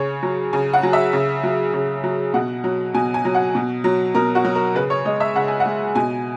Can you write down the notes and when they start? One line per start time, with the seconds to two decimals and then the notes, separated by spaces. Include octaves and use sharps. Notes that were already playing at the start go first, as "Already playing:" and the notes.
Already playing: C#3 C#5
0.23 F#3
0.53 C#3 G#5
0.73 F#5
0.83 F#3
0.93 E5
1.13 C#3
1.43 F#3
1.74 C#3
2.03 F#3
2.34 B2 F#5
2.64 F#3
2.94 B2 G#5
3.14 G#5
3.25 F#3
3.34 F#5
3.55 B2
3.84 F#3
4.15 B2 A#4
4.35 F#4
4.44 F#3
4.55 A#4
4.75 C#3 B4
4.90 C#5
5.05 G#3 D#5
5.20 E5
5.35 C#3 F#5
5.48 G#5
5.60 F#5
5.65 G#3
5.95 B2 G#5